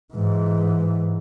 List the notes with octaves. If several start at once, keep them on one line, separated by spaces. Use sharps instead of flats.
G#2 E3